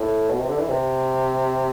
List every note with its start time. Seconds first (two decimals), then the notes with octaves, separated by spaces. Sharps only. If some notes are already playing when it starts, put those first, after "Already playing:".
Already playing: A2
0.30 B2
0.39 C3
0.48 D3
0.59 E3
0.68 C3